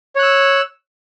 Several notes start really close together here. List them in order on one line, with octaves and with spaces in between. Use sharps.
C#5 F#6 E6